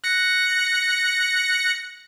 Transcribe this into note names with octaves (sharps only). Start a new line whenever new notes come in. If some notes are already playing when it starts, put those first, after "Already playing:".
F#6 A#6 C#7